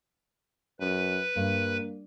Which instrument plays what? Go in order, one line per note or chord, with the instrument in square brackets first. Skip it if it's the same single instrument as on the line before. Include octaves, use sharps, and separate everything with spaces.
[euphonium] F#2 [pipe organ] B4
[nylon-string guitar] G2 [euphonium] A#3